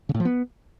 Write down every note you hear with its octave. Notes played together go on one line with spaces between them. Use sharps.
C#3
A2
F3
B3